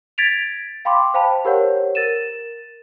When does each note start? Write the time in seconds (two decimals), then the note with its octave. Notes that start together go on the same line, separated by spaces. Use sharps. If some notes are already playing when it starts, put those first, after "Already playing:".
0.18 G#6 A6 B6 D7 F7
0.85 F5 G5 B5 C6 D6
1.14 C5 F5 G5 A5 B5
1.45 G4 A#4 C5 C#5 F#5
1.95 A#4 A6 D#7 E7